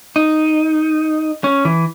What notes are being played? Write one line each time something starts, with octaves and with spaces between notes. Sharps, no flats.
D#4
C#4
E3